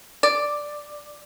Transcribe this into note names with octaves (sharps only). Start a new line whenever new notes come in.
D5